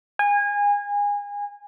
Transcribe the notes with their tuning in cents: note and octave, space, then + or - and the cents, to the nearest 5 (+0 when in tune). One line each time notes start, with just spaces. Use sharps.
G#5 -25